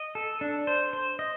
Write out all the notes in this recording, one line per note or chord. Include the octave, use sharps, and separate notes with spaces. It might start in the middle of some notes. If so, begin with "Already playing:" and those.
Already playing: D#5
A4
D4
C5
C5
D#5